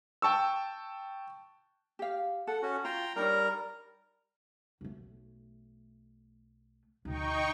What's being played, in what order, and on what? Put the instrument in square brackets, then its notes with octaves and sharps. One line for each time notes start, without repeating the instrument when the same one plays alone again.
[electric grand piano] G5 A5 C#6 E6
[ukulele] G4 F5
[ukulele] A4 [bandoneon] F#5
[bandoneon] C#4 F#4
[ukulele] F4 [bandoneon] G5 A#5 C6
[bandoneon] G3 A#4 A#5 [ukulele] D4 D#4 C#5
[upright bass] B1 A3
[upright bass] D2 B2 [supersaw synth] D#4 G5 C#6